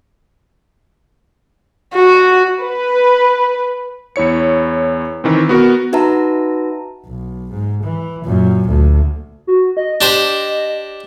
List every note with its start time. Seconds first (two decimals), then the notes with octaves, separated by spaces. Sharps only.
1.94 F#4
2.63 B4
4.16 E2 E4 C#5 C#7
5.24 D#3 E3 C4
5.49 B3 F#4 A#4
5.93 D#4 F#4 B4 E5 A5 A#5
7.05 B1
7.51 G#2
7.83 E3
8.24 F#2 A#2
8.68 D2
9.47 F#4
9.77 D#5
10.01 D4 G4 C5